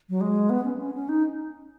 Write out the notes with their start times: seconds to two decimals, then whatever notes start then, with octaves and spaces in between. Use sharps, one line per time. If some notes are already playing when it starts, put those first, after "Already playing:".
0.09 F#3
0.21 G#3
0.50 B3
0.65 C#4
0.80 C#4
0.94 C#4
1.09 D#4